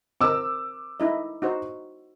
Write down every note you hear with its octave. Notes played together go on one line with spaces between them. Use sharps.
C4 A#4 D6 E6
D#4 E4 D#5
D#4 F#4 C5